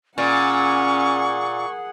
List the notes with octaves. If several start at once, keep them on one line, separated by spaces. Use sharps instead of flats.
A#2 C#4 G#4 F#5 C#6